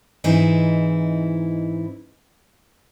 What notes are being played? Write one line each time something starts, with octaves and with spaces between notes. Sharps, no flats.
G#2 E3 C4 D#4 E4